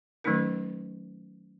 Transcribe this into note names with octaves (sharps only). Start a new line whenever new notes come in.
D#3 F#3 A3 C#4 D#4 A#4